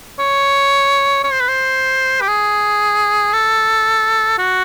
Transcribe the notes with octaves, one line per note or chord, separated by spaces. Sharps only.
C#5
C#5
C5
B4
C5
G4
G#4
A4
F#4